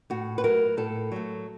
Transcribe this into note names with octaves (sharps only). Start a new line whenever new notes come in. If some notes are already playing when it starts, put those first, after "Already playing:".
A2 F#4
B4
F#3 A3 A#4
A2 A4
F#3 A3